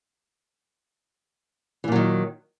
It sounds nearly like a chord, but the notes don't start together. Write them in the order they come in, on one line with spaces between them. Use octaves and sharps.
E3 A#2 F#3 D#3